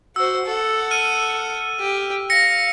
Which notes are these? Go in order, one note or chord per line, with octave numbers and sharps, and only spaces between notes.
F#4 C5 E6
A4 F#5
F6 D#7
G4
F5 A#6 C#7